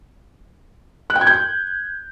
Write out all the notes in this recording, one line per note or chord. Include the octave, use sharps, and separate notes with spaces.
F#6
G5
G#6
G6